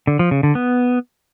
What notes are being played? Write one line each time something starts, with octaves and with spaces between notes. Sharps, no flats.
D3
F3
C#3
D3
B3